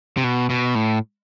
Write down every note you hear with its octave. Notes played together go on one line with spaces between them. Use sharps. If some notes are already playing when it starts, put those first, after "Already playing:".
C3
B2
B2
A2